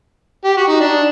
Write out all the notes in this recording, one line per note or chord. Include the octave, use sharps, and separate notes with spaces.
G4
F#4
D#4
D4